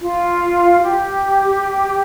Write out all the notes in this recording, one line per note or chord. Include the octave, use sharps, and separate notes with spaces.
F4
G4